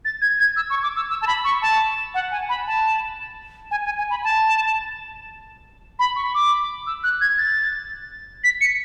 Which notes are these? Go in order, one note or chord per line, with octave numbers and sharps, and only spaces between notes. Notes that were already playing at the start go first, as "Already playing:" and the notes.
A6
G#6
G#6
E6
C#6
D6
E6
E6
A5
B5
C#6
A5
F#5
G#5
B5
A5
G#5
G#5
G#5
B5
A5
B5
C#6
D6
E6
F#6
G#6
A6
B6
C#7